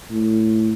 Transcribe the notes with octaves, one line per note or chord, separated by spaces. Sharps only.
A2